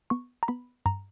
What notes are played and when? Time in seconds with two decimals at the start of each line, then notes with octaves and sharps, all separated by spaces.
0.10 B3 C#6
0.43 A#5
0.48 B3 B5
0.86 G2 A#5